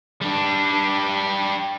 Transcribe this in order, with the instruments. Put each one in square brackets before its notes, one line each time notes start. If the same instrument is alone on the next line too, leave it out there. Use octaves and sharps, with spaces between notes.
[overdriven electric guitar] G3 D4